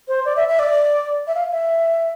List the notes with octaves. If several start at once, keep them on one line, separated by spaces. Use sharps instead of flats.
C5
D5
E5
E5
D5
E5
F5
E5